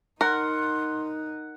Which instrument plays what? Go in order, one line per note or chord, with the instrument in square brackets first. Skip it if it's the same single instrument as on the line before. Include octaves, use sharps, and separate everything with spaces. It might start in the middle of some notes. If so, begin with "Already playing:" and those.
[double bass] D#4 [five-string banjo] A#4 [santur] F#5 [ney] C6